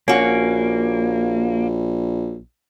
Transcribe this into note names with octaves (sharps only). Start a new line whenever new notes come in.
A#1 A#3 C#4 F#4